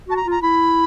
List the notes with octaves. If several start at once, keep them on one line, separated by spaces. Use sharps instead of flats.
F#4 A5
A#5
F4
A#5
E4 B5